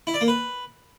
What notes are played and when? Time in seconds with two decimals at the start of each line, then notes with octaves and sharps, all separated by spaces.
0.07 E4
0.14 D5
0.21 A#3
0.28 B4